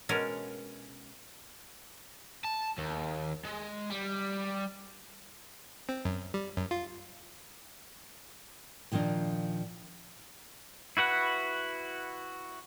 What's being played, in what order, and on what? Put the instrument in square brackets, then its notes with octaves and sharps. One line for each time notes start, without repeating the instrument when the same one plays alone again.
[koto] B2 G#3 C#4 D4 A#4
[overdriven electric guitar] A5
D#2
G#3
G3
[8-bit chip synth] C4
F#2
G3
F#2
F4
[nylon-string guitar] A#2 D#3 F3 A#3 D4
[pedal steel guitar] E4 F#4 B4 F#5